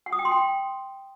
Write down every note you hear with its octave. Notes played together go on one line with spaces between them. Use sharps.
F#5
D#6
G5
C6
G5